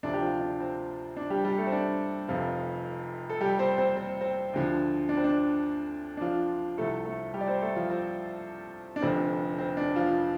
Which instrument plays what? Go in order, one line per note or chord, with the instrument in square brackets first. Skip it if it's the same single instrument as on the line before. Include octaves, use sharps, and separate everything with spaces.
[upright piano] D2 C3 F3 D4
G4
F3 F4
D4
C4
D4
G3 G4
G3 G4
A3 A4
C4
D4
F1 F2 C3 F3 F4
A4
G3 G4
C4 C5
C4 C5
C4
C4
D2 D3 F3
D4
C4
D4
D4
F3 F4
C2 C3 F3 A3 A4
A3 A4
G3 G4
D5
C4 C5
A3 A4
F3 F4
C4
D4
F1 F2 D3 F3 C4
C4
D4
F3 F4